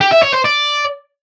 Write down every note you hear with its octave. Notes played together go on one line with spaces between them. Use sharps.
G4
E5
C#5
C5
D5